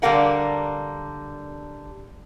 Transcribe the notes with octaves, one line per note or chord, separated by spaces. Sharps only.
D3 G3 D4 A#4 F5 F#5